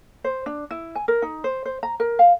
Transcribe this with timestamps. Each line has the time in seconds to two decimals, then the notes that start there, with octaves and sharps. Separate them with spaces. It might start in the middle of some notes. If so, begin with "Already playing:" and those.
0.24 C5
0.46 D4
0.71 E4
0.95 G#5
1.08 A#4
1.22 D#4
1.44 C5
1.65 C5
1.83 A#5
2.00 A#4
2.19 F5